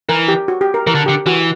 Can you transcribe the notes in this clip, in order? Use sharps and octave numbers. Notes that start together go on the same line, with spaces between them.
E3 A#4
G4
F#4
G4
A#4
E3 A#4
D3
D3 G4
E3 F#4